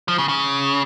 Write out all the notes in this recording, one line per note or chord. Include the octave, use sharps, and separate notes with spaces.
F3
C#3
C#3